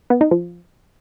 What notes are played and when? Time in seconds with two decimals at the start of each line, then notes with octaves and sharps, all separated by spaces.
0.10 B3
0.21 D#4
0.31 F3